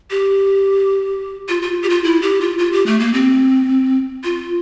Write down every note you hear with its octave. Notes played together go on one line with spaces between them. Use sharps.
G4
F4
F4
G4
F4
E4
G4
F4
F4
G4
A3
A#3
C4
F4